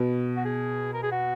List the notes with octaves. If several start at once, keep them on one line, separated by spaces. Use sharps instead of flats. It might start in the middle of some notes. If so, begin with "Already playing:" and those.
Already playing: B2
F#4
G#4
A#4
G#4
F#4